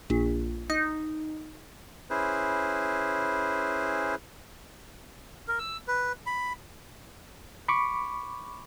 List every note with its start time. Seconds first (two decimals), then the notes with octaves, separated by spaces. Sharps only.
0.10 A#1
0.70 D#4
2.10 C#4 E4 G#4 B4 C5
5.48 A#4
5.59 E6
5.88 B4
6.26 B5
7.68 B5 C#6 D6